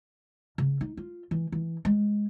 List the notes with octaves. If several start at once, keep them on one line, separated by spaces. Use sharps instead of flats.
C#3
D#4
F4
E3
E3
G#3